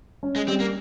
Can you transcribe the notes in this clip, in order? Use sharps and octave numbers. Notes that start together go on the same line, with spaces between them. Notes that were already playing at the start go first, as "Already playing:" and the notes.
C#4
G#3
G3 C4
A#3